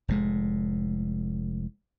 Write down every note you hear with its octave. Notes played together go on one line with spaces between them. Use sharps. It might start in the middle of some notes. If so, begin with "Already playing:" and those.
F1 A2 G#3